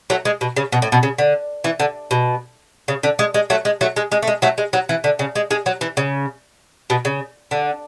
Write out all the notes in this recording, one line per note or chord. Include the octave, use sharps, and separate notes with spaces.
F#3 A3
G#3
B2
C#3
B2
A2
B2
C#3
D3
E3
D3
B2
C#3
D3
G#3
G#3
F#3 A3
G#3
F#3 A3
G#3
G#3
A3
G#3
F#3 A3
G#3
F#3
E3
D3
C#3
G#3
G#3
F#3
E3
C#3
B2
C#3
D3